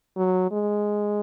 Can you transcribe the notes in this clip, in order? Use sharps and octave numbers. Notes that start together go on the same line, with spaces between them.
F#3
G#3